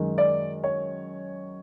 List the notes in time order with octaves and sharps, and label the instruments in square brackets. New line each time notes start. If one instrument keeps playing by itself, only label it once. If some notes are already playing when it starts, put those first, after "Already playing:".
Already playing: [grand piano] F#2 D#3 G#3
D5
C#5